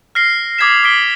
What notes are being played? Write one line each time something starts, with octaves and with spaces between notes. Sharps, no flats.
F6 A#6 C7 G7
D6 D#6 G#6 A#6 B6 E7
D6 D#6 B6 D7 G7